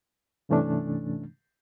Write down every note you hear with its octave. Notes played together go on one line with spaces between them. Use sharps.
G2 C3 E3 A3 C#4 D4